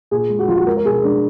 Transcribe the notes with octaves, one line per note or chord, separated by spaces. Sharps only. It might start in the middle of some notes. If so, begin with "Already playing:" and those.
A#2 G#4
G#3
F#4
F3 F4
F#4
G#3 A#4
A#4
B2 G#4
G#3 D4